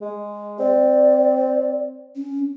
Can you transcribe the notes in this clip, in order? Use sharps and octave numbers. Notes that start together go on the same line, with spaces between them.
G#3
C4 D5
C#4